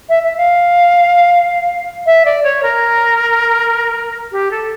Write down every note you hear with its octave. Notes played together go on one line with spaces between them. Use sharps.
E5
E5
F5
E5
D5
C#5
A#4
G4
A4